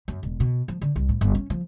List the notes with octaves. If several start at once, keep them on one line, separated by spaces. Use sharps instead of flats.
F#2
E1
B2
F3
D3
C2
A2
G1
C#4
F3